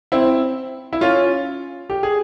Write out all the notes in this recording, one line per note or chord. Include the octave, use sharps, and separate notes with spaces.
C4 E4
E4
C#4 F4
G4
G#4